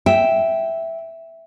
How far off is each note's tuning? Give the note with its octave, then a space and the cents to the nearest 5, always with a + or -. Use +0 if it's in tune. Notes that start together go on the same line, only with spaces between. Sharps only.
E5 +0 G5 -5